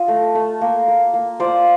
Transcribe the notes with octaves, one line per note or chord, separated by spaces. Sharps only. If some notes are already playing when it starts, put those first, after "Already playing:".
Already playing: F4 D#5
A3
A3
A#3
A#3
A#3
F4 C5 D5